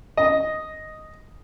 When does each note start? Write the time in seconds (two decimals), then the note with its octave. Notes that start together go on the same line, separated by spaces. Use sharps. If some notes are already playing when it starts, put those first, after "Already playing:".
0.17 D#5